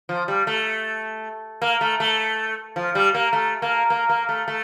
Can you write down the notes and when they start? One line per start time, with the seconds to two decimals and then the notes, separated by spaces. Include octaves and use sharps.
0.09 F3
0.28 G3
0.47 A3
1.62 A#3
1.81 A3
2.00 A3
2.76 F3
2.95 G3
3.14 A#3
3.33 A3
3.62 A#3
3.90 A#3
4.09 A#3
4.29 A3
4.48 A3